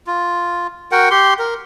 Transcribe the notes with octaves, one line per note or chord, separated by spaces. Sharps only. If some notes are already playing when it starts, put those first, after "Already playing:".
F4
F#4 A#4 F#5 G5
G4 C6
A#4